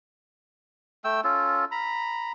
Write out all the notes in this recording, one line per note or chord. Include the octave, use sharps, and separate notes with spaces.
A3 G5 E6
C#4 F4 A4
A#5 B5